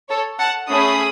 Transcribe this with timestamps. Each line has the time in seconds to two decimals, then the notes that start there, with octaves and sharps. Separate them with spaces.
0.09 A4 C#5
0.39 F#5 A5
0.69 A3 C#4 G#4 B5 D#6